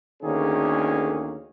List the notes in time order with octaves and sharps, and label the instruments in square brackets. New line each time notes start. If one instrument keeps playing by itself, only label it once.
[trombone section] D2 D3 D#3 A#3 C#4 G#4